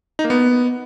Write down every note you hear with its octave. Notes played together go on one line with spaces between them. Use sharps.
D#4
A#3
B3